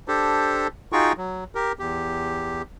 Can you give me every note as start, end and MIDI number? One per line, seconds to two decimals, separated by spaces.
0.08 0.67 62
0.08 0.67 67
0.08 0.67 69
0.08 0.67 72
0.92 1.13 63
0.92 1.13 65
0.92 1.13 66
0.92 1.13 68
0.92 1.13 79
0.92 1.13 85
1.18 1.44 54
1.55 1.72 67
1.55 1.72 70
1.79 2.62 40
1.79 2.62 67